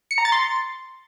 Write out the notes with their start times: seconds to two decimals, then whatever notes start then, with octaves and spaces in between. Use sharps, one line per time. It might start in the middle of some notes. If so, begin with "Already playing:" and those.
0.11 C#7
0.18 A#5
0.25 A6
0.32 C6